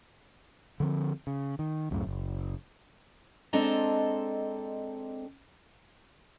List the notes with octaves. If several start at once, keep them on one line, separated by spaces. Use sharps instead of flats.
D3 F3 C4
C#3
D#3
C#2 F#2 A2 C#3
F#1
G#3 C4 D4 A4 D#5 A#5